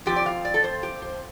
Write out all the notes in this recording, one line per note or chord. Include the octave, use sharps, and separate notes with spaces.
F2 F3 C4 G4
D5
F5
D5
A4
C5
G4
C5